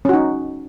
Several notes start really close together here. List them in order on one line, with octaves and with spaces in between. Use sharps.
C#4 F#4 D#4